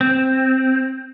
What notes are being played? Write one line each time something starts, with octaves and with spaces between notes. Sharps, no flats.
C4